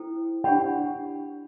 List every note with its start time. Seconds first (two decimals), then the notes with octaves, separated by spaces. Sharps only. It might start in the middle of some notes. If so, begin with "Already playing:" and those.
Already playing: E4 A4 C5 G5
0.44 D4 G4 D5 F#5 G5 B5